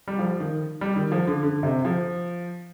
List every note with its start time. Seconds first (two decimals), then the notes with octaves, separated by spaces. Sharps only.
0.08 G3
0.19 F3
0.40 D#3
0.81 G3
0.96 D#3
1.12 F3
1.27 D3
1.43 D3
1.63 C3
1.85 F3